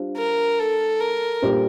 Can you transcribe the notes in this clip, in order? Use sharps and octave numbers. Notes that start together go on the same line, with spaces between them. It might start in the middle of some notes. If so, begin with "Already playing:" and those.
Already playing: G3 D4 F4 C5
A#4
A4
A#4
A#2 G3 D4 G4 C5